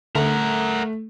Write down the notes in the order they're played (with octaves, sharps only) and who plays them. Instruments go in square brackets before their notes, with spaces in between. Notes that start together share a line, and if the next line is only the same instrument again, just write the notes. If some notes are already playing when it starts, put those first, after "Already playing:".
[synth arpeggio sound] D3 [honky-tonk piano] A3 [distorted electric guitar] A#4 F#5